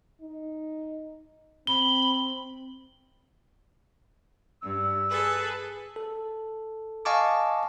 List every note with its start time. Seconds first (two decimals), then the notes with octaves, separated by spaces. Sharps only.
0.21 D#4
1.67 C4 B5 G7
4.62 G2 E6
5.08 G#4 A4 B4
5.96 A4
7.05 D#5 F5 G#5 A5 C#6 D6